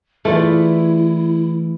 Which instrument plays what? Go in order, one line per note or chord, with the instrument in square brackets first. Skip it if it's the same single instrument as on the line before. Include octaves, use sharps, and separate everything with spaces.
[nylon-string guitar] E3 G#4 [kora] A3 F4 D5 [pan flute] E4